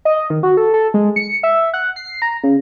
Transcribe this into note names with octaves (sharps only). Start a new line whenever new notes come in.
D#5
D#3
F#4
A4
A4
G#3
C#7
E5
F#5
C7
A#5
C#3